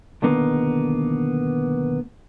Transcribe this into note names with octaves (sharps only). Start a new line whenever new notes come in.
B1 E2 D3 D#3 A#3 B3